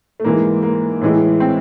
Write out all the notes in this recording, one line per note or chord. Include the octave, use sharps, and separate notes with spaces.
A3
G#2 E3 G#3 A#3
A#3
A2 E3 G#3
C4